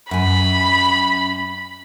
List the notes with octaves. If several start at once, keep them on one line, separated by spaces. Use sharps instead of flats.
F#2 G#5 B5